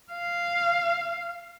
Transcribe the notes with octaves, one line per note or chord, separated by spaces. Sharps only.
F5